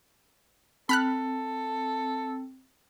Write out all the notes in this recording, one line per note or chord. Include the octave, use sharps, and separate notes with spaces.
C4 A4 B5 F6 F#6